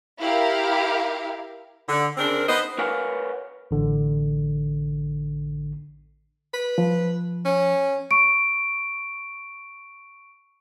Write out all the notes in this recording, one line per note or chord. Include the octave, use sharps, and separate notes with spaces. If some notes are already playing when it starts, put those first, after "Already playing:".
E4 G4 A#4 F5
D3
C#3 C4 D4 A#4
B3 D#4 B4 C5 D#5
A#4 B4 C#5 F5 F#5 G#5
A1 D3
B4
F3
C#4
C#6 D7